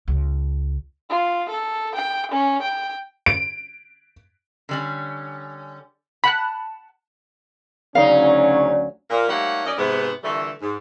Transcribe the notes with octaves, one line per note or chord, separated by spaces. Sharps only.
C#2
F4
A4
G5
C#4
G5
D7
D3 G3 C#4
F#5 A5 B5 F#6
D2 C#3 F#3 C#4 D#4 D5 F5
A#2 A#3
G3 A3 A#3 D#4 C#5 F#5
F#2 C#4 D5 D#5
G#2 C3 B3
A#2 D3 E3 G3 A3
G#2